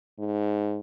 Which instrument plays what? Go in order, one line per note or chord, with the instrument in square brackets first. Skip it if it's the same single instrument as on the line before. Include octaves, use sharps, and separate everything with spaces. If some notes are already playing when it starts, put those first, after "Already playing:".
[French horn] G#2